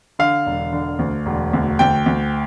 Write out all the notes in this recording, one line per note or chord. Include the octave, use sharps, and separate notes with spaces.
D3 F5
E1
D3
D2
E1
D2
D2 G5
D2